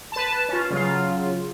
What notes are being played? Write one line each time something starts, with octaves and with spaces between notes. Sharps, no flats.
B4 A5
C#4 F4
C#3 F#3 F4